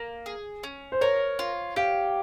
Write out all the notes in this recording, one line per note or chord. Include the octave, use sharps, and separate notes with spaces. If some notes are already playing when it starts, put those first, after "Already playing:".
Already playing: A#3
G#4
C#4
C5
A#4 C#5
F4
G4 F5